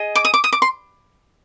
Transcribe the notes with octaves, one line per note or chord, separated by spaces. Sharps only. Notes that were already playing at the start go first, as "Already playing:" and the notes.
Already playing: G#4 D#5
D6
D#6
D6
D#6
D6
C6